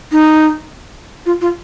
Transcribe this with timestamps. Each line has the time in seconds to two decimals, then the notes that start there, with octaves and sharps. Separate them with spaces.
0.12 D#4
1.26 F4
1.41 F4